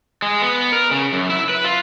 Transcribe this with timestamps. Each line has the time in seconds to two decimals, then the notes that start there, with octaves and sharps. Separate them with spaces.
0.22 G#3
0.42 B3
0.72 A#4
0.91 C#3
1.13 F#2
1.29 E4
1.49 B4
1.64 F4